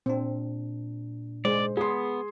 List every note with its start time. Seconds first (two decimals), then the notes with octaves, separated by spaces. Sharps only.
0.06 A#2 C4 D4
1.45 G#3 C5 D5
1.77 B3 G#4 C6